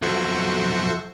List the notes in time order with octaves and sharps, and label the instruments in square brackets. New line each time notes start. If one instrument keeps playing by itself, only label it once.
[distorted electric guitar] B1 F2 [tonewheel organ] F3 A4 E5 [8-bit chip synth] F#4 C5 C#6